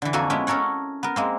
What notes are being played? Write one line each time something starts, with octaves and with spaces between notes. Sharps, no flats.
D3 E3
F2 A#3 F#4 A4 G#5
G#3 B3 C#4 E4
C#4 A4 A#4 C#5 F#5
B3 A#4
G#3 A#3 C4